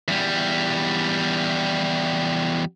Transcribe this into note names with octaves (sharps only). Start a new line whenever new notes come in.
E2 G3